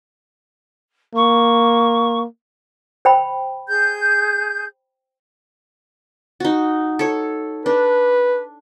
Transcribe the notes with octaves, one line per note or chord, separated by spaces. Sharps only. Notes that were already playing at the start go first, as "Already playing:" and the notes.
A#3 C#6
C5 G5 B5
G#4 G6
D#4 F#4
A4 C#5
D4 B4